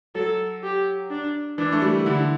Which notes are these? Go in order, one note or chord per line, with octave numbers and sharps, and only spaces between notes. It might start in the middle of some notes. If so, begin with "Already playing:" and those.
F#3 A4
G4
D4
E3 D4
A3
G3
D3 E4